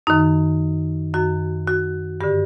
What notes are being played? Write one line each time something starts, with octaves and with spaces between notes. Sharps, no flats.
F#2 D#3 D#4
F#2 D#3 F#4
F#4
G2 D3 G4